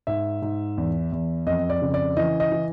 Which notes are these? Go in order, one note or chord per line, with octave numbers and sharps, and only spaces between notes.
G#2 E5
G#2
E2
E2
F2 D#5
D5
C#3
D5
E3 D#5
D#5
E3